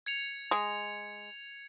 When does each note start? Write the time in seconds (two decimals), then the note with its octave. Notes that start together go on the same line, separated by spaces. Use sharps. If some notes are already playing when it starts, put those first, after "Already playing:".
0.06 G#6 C#7 F7
0.51 G#3